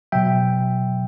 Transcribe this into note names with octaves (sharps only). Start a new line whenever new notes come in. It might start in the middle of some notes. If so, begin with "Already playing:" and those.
B2 F#3 E5 G5